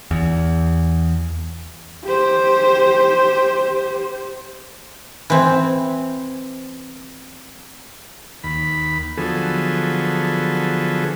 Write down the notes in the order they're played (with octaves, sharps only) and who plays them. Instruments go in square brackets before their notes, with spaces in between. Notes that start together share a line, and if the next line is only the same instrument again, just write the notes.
[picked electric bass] E2
[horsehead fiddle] G4 C5
[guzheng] E3 C4
[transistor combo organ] D#2 B5
D3 F3 F#3 B3 G#4 A4